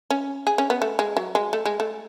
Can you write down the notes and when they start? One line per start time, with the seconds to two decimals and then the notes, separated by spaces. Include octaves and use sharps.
0.10 C#4
0.47 G#4
0.58 C#4
0.70 B3
0.82 A3
0.99 G#3
1.17 F#3
1.35 G#3
1.53 A3
1.65 G#3
1.80 A3